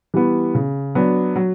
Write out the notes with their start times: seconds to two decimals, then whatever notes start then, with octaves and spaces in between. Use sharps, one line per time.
0.14 E3 G3 B3
0.55 C#3
0.95 F#3 B3 D4
1.36 F#3